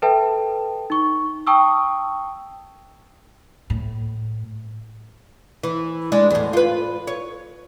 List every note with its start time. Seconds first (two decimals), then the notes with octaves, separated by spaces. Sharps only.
0.02 A4 B4 E5 G5 A5
0.90 D#4 C#6
1.47 G5 A5 C#6 D#6 E6
3.70 A2
5.63 E3
6.12 G#3 D4
6.31 E2 A2
6.53 F4 B4
7.07 C#5